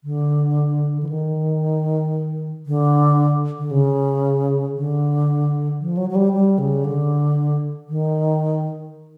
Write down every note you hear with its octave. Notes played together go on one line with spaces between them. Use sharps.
D3
E3
D#3
D3
D3
C#3
D3
F3
F#3
F#3
G3
G3
C#3
D3
D#3